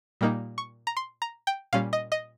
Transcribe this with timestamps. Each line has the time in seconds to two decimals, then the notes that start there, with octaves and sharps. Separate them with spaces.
0.21 A#2 G3 A#3 D#4
0.58 C#6
0.87 A#5
0.97 C6
1.22 A#5
1.47 G5
1.73 A#2 G3 C#4 F5
1.93 D#5
2.12 D#5